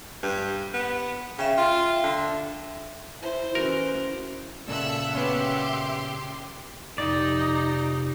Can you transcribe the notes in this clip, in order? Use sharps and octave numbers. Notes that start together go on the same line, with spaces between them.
G2
B3
C#3 E5 G5
F4
D3
E4 C5
E3 C#4 E4 F#4 A#4
A#2 C#3 A4 E5 F#5 E6 F#6
B3 C#4 G4 C6
F2 C3 D#4 D5